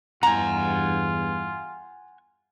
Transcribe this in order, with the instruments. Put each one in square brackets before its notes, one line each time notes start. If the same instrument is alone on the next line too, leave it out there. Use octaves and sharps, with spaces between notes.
[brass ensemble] E2 G2 [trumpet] F4 [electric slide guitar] F#5 G#5 [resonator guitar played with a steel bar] A#5